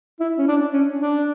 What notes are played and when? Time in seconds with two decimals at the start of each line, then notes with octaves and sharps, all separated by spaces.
0.20 E4
0.38 C#4
0.48 D4
0.73 C#4
1.00 D4